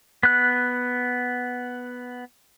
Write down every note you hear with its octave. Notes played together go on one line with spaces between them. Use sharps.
B3 F#6